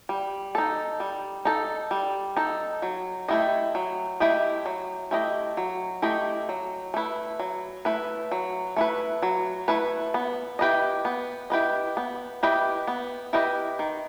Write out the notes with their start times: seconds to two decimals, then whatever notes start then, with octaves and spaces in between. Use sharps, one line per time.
0.09 G3
0.55 D#4 A4
1.00 G3
1.45 D#4 A4
1.91 G3
2.37 D#4 A4
2.82 F#3
3.28 A3 E4 G4 D#5
3.75 F#3
4.20 A3 E4 G4 D#5
4.66 F#3
5.11 A3 E4 G4 D#5
5.57 F#3
6.02 A3 E4 G4 D#5
6.49 F#3
6.94 A3 E4 B4
7.39 F#3
7.85 A3 E4 B4
8.31 F#3
8.76 A3 E4 B4
9.22 F#3
9.68 A3 E4 B4
10.14 B3
10.59 E4 G4 B4 D#5
11.05 B3
11.50 E4 G4 B4 D#5
11.97 B3
12.43 E4 G4 B4 D#5
12.87 B3
13.33 E4 G4 B4 D#5
13.79 D#3